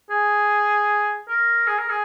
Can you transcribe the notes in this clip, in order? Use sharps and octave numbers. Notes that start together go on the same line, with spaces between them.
G#4
A#4
G#4
A#4
G#4